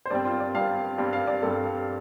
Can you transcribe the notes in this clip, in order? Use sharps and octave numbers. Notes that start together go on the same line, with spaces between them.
C5
G2 G3 C4 D5
F4
D5
G2 G3 C4 F5
G2 G3 C4
F5
D5
G2 G3 C4 A4